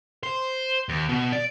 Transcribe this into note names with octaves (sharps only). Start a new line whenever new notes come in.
C5
D#2
B2
D5